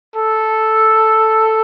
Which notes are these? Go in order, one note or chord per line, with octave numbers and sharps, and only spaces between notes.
A4